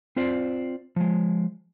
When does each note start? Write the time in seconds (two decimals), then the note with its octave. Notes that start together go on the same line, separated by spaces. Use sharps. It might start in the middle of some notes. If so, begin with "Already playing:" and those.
0.16 C4 F4 C5 D5
0.96 F3 G#3